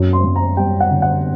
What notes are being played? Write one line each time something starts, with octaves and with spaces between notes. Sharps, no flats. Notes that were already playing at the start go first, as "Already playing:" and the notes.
Already playing: F#2
C6
F#2
A#5
G3 G5
F#5
D3
F#5